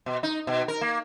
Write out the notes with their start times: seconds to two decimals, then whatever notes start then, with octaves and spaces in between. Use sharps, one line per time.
0.06 B2
0.23 D#4
0.47 B2
0.68 A#4
0.81 A#3